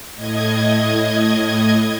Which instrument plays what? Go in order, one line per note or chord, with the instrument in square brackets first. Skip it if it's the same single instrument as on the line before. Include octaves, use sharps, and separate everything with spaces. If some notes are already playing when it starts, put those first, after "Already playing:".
[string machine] A2 D#5 G#6